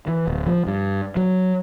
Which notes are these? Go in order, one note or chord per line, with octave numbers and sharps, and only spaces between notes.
E3
D1
F3
G2
F#3